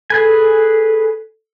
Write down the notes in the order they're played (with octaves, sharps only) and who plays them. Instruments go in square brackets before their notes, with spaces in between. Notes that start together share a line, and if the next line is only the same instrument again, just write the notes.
[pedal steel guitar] G#4 B4 G#5 [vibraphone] A4